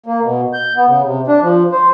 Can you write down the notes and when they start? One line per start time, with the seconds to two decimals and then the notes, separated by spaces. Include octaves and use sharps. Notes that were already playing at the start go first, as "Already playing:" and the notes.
0.06 A#3
0.22 B2
0.53 G6
0.76 B3
0.88 C#3
1.03 C3
1.28 D4
1.42 F3
1.72 C5